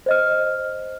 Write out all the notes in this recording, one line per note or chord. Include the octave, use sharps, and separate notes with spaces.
C5 D#5 F6